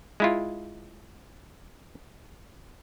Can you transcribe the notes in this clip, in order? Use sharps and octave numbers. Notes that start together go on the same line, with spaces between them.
G#3 E4 F4